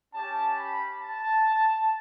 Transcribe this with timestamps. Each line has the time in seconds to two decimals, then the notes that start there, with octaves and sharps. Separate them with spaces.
0.14 C#4 G4 A5
0.57 B5
1.00 A5